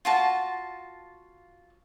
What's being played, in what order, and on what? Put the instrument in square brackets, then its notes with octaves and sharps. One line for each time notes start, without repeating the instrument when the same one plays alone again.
[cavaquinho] F4 F#4 A5